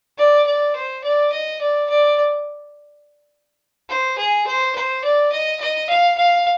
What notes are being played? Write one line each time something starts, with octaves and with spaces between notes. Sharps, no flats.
D5
D5
C5
D5
D#5
D5
D5
C5
G#4
C5
C5
D5
D#5
D#5
F5
F5